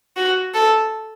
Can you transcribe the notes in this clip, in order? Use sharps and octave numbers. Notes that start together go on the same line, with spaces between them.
F#4
A4